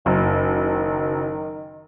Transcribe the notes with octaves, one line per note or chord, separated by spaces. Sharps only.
F#1 D#3